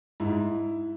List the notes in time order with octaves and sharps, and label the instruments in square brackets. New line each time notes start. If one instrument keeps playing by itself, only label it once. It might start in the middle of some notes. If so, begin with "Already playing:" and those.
[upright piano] G#2 E4